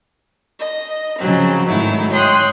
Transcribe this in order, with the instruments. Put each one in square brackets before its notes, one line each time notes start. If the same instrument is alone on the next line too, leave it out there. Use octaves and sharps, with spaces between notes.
[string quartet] D#5
C#3 F3 F#3 C4
G#2 D#3 F#3 A3 D#4 E4
C#5 G5 C6 D#6 F#6